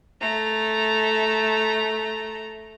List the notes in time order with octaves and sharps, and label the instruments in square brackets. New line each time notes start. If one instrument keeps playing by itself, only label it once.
[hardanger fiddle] A3 A#5